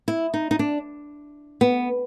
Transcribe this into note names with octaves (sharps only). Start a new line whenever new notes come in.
E4
D#4
D#4
D4
B3